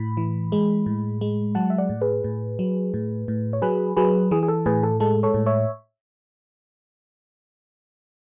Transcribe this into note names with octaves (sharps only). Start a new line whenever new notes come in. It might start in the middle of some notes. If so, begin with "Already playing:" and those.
Already playing: A2 B5
E3
G#3
A2
G#3
F#3 F#5 A5
E5
D5 F#5
A2
G#4 B4
A2
F#3
A2
A2
C#5
F#3 G#4 B4
F#3 G#4 B4
E3 G#4
G#4
A4
A2 G#4 B4
A4
G#3 A4
A4 C#5
A2
C#5 E5